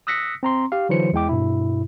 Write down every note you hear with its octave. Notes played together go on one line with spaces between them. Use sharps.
D#6 E6 F#6 A#6 B6 C#7
C4 A#5 C6
G4 F5
D3 E3 F#3 C5 C#7
E2 G#3 E4 G5 D6
G2 B2 E4